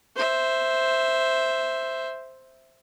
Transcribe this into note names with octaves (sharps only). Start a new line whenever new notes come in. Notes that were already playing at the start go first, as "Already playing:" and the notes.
C5 E5